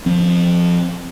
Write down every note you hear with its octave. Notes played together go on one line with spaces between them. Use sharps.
F3 C4